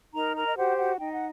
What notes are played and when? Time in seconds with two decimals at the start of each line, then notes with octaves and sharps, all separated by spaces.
0.14 D#4 A#4 A#5
0.35 A#4 A#5
0.46 D#5
0.56 F#4 G4 C5 F#5
0.77 F#4 F#5
0.99 D#4 G5
1.12 F#5